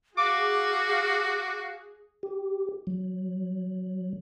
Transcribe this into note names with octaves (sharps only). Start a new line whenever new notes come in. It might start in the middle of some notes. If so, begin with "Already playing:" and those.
F#4 G#4 F5 D6
G4
F#3